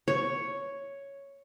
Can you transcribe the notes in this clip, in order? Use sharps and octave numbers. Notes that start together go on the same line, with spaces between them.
C#5